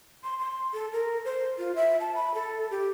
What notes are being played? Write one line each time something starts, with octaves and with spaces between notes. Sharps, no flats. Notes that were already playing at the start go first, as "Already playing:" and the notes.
C6
C6
A4
A#4
C5
F4
E5
A5
B5
A4
G4